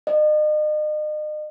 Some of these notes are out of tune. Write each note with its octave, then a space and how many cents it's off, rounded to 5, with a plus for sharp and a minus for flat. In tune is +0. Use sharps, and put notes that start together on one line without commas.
D#5 -40